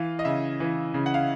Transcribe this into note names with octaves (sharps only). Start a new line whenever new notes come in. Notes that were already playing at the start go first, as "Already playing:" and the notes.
Already playing: E3 F5
D#5
C#3 E5
E3
C#3
F#5
F5